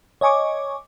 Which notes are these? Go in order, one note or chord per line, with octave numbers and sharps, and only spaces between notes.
C#5 D#5 G#5 C#6 D6